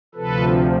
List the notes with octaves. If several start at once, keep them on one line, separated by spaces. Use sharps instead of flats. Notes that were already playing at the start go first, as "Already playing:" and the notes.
D2 C3 F3 A4 B4